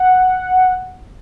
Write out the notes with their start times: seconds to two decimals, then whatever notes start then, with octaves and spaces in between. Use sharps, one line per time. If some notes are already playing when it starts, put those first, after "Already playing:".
Already playing: F#5